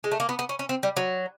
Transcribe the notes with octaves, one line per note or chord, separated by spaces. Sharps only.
G#3
A3
A#3
B3
B3
C#4
C#4
C4
G3
F#3